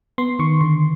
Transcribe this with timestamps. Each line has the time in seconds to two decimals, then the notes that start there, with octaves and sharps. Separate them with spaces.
0.18 B3 C6
0.39 D#3 C#6
0.61 D3 C6